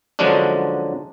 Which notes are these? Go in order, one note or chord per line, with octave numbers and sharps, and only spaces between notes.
D3 F3 F#3 G#3 C#4 D4